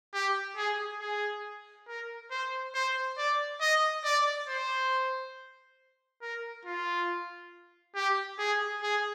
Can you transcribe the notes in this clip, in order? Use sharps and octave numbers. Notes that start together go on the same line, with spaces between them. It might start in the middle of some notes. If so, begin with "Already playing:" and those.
G4
G#4
G#4
A#4
C5
C5
D5
D#5
D5
C5
A#4
F4
G4
G#4
G#4